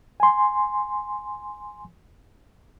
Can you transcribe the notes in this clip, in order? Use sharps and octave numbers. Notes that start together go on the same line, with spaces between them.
G#5 C6